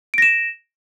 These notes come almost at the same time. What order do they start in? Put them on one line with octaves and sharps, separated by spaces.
D7 A#6 E7